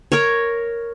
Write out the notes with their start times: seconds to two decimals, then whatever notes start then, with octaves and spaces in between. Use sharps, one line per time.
0.12 A#4 C#5